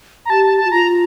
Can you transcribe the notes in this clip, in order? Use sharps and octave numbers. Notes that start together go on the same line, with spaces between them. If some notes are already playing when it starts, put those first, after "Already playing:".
A#5
G4 A5
A5
A5
F#4
F4 A#5